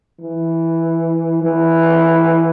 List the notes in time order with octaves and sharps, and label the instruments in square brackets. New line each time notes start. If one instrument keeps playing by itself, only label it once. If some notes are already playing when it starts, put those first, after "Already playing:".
[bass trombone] E3
E3